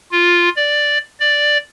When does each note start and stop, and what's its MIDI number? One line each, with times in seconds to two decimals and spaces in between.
0.11 0.49 65
0.56 0.98 74
1.20 1.57 74